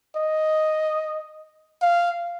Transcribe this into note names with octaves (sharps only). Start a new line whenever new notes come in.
D#5
F5